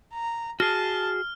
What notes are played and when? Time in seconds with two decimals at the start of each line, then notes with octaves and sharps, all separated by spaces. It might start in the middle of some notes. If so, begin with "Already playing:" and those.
0.13 A#5
0.60 F#4 G#4 A5 F6